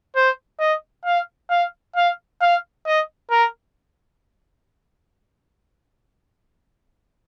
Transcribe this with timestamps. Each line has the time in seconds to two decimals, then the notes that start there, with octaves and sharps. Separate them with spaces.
0.16 C5
0.60 D#5
1.05 F5
1.50 F5
1.96 F5
2.41 F5
2.86 D#5
3.31 A#4